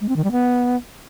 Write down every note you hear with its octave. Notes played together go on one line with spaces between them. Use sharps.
G#3
C4
D#3
G3
B3